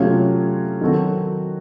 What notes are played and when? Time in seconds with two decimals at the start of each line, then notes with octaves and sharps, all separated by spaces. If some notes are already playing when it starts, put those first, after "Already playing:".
Already playing: C3 F#3 A3 C#4 F4
0.81 D#3 F#3 C4 F#4 A4